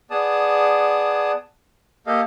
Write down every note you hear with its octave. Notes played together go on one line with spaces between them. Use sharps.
B3 G#4 D5 A5 D#6
A#3 G4 A4 D#5 F5